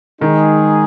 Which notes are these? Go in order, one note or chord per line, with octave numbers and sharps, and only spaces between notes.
D#3 G#3 D#4 G#4